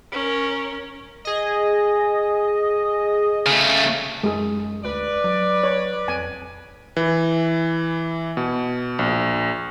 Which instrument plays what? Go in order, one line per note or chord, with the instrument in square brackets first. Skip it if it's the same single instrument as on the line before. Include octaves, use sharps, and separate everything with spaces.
[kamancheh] C#4 A#4
[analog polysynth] G#4 D#5
[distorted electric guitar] C#3 A3
[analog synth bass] F#2 [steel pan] G#3 G#4
[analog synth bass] D2 [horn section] B4 D5
[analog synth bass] F#3
[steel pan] C#5
[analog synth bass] F2 [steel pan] G#5
[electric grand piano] E3
B2
A#1